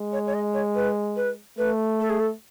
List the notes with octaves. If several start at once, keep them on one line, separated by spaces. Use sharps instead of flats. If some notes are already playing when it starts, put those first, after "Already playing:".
Already playing: G#3
C#5
C#5
D#5
C#5
B4
B4
A3 B4
A4
G#4
A4